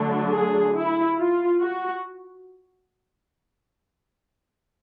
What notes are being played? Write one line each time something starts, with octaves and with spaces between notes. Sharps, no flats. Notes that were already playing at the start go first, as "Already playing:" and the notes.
Already playing: D3 F#3 A3 D4
G#4
E4
F4
F#4